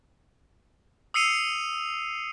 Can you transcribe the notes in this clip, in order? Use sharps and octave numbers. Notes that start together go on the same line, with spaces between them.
D#6 E6 C7 C#7 D#7 F7